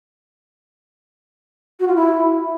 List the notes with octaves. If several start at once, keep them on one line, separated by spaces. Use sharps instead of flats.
F#4
F4
E4